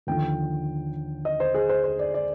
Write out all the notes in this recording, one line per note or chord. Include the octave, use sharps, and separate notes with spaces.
D#2 D3 F3 G5
D#5
C5
G#4
C5
C5
D5
D5